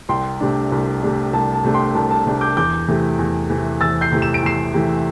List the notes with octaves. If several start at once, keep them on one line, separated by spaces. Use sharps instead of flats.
C2 G5 C6
C3 A3 D4
C2
C3 A3 D4
C2 A5
A5
C3 A3 D4
G5 C6
C2 A5
A5
C3 A3 D4
D6 G6
E2 D6 G6
C3 E3 A3
E2
C3 E3 A3
E2 E6 A6
G6 C7
C3 E3 A3
E7
D7
E2 C7 E7
C3 E3 A3